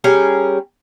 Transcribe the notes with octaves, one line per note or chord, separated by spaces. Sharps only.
G3 C#4 G#4 A#4